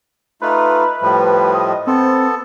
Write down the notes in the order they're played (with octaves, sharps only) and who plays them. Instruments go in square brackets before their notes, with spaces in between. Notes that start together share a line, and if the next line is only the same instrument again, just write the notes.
[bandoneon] A3 D#4 F4 [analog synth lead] B4
[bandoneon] A2 F3 G3
[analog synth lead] D#5
[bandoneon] B3 A4 [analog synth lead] C4